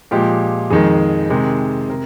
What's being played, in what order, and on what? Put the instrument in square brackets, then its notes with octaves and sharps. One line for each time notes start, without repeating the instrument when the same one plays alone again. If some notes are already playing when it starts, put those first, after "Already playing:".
[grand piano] A#2 F3 G#3 G4
F2 D#3 G#3 G#4
C3 D#3 G#3
C3 A#4